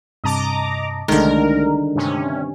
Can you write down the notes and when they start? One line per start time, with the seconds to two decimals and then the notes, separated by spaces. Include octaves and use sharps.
0.24 G2 C3 D#5 A5 A#5 D6
1.08 C2 D3 D#3 G#3 A3 A#4
1.95 G2 C3 C#4